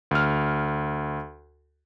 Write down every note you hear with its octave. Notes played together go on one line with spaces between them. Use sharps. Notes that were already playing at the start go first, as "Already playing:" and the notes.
D2 F6